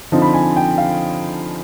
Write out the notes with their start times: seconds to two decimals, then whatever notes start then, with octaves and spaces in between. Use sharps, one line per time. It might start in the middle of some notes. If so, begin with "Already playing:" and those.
0.12 D3 F3 C4 D#4
0.22 B5
0.34 G#5
0.56 G5
0.78 F5